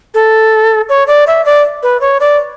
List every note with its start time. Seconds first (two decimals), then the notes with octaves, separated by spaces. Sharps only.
0.14 A4
0.89 C#5
1.07 D5
1.27 E5
1.46 D5
1.83 B4
2.01 C#5
2.20 D5